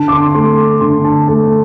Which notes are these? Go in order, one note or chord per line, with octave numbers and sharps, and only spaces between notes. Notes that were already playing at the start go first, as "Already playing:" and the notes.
Already playing: D3 A5
D6
C6
A3 C6
D3 C6
A5
A3 A5